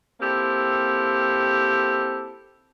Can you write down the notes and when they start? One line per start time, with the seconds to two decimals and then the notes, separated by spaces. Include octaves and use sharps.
0.21 A#3 C4 E4 G4 A4